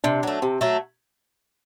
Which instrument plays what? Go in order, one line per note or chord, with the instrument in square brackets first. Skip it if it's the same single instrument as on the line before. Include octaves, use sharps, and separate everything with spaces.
[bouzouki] C3 [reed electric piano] D4
[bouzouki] F#3 A3
[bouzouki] C3 [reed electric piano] C4
[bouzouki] F#3 A3